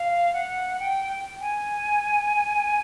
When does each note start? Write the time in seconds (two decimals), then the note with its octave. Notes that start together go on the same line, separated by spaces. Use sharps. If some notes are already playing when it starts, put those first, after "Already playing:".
Already playing: F5
0.33 F#5
0.79 G5
1.40 G#5